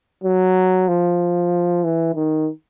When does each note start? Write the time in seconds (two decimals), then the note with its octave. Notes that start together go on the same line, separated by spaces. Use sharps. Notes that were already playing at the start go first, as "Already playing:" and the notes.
0.24 F#3
0.88 F3
1.84 E3
2.15 D#3